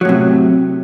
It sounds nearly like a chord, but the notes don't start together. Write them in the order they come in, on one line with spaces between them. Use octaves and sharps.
F#3 A2 C3